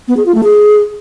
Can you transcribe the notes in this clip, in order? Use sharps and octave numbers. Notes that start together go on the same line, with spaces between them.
B3
G#4
F4
A3
G#4